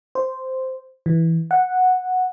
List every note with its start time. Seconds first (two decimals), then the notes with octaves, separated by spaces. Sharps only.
0.15 C5
1.06 E3
1.51 F#5